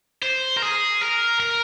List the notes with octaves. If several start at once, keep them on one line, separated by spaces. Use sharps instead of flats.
C5
A#4
G#4
A#4
A#4